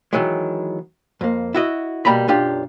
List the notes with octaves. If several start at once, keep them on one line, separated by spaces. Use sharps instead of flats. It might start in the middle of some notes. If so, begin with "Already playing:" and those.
D#3 E3 F#3 G#3
F2 A#3
E4 F#4 D#5
B2 F3 G3 A#3 A#5 B5
B1 F#2 D4 F4 G4